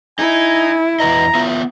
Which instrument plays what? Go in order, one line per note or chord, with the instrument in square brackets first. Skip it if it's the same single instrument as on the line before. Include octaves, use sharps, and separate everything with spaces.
[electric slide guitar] D#4 [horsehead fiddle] E4 [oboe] G#5
[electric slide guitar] E2 B4 D#5 [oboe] A#5
[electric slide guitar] B3 F4 E5